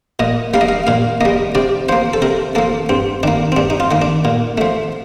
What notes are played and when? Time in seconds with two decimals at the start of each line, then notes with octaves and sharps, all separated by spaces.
0.19 A#2 D#5
0.54 G3 A#3 F5
0.61 D#5
0.69 F5
0.87 A#2 F5
1.21 G3 A#3 D#5
1.55 C3 D5
1.89 F3 A#3 C5
2.13 A4
2.22 C3 A#4
2.55 F3 A#3 A4
2.89 G2 C4
3.23 D#3 A#3 D4
3.52 C4
3.56 G2 D4
3.70 D#4
3.80 F4
3.91 D#3 A#3
4.02 D4
4.25 A#2
4.58 F3 A3